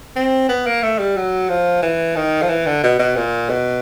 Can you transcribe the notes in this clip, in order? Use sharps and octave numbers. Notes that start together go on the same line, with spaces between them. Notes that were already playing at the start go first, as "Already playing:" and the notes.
C4
B3
A#3
A3
G3
F#3
F3
E3
D#3
F3
E3
D3
B2
B2
A#2
B2